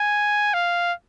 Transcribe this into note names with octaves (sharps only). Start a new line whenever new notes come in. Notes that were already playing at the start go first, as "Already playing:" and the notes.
Already playing: G#5
F5